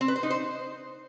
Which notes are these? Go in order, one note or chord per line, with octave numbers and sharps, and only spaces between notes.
C4
B4
C5
D#4
C5